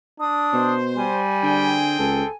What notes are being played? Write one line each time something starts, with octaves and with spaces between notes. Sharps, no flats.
D4 D#6
B2 C5
G3 G#5
D3 C4 G#4 G5
C#2 A4